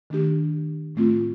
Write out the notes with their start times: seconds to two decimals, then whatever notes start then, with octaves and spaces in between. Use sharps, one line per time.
0.10 D#3 A3 D4 G4
0.95 A2 A3 C4 F4